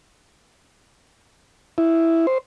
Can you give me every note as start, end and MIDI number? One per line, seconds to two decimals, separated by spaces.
1.78 2.26 64
2.27 2.38 72